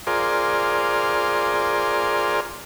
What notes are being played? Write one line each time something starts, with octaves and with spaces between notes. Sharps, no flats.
F4 G#4 A#4 C5 D5